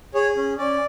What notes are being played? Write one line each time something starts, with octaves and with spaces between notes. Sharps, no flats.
G#4 C#5
C#4
C#4 D5